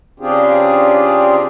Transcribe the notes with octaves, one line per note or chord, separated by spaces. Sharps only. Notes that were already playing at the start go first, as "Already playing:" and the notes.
C#3 C4 D4 F4 G4 G#4